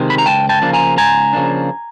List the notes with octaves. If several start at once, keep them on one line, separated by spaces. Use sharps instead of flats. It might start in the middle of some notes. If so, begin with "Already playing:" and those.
Already playing: C3 D#3 G#3
B5
A#5
C#2 G5 A5
G5 A5
C#3 F3 A#3 D4
G#5 A#5
C#2 G#5 A#5
C#3 F3 A#3 D4